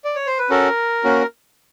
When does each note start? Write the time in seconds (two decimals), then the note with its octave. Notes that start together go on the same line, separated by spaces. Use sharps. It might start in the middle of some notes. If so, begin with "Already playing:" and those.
0.04 D5
0.16 C#5
0.27 C5
0.39 B4
0.50 C#4 F#4 A4 A#4
1.04 A#3 C#4 F#4